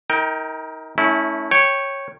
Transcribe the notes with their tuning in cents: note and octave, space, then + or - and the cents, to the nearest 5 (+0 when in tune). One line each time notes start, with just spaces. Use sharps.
D#4 +35 A#4 +0 G5 +0
A3 +0 C#4 +10 E4 -25
C#5 -10 G5 +0